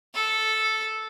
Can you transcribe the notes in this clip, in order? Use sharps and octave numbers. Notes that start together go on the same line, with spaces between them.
A4